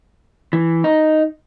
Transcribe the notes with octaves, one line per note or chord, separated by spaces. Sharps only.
E3
D#4